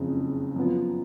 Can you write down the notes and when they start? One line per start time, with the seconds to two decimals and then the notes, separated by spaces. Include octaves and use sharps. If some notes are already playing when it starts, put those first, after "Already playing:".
Already playing: F#1 F2 C#3
0.56 F#2 F3 B3